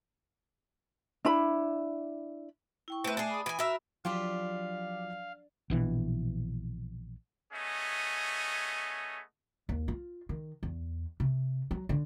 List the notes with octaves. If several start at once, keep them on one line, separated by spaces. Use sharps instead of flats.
D4 E4 B5
E4 G5 C#6
A3 C4 B4 E5
D4 G#4
B5 D#6
E3 G#5
F#4 A#4 E5 B5
F3 F#3 D4 F4 G4 F5 B5
A#1 B2 E3
A3 B3 C#4 G#4 D#5
D#2
F4
D#3
E2
C3
F#3
D3